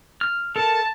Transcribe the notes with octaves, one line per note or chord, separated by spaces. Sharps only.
F6
A4 A#4 A5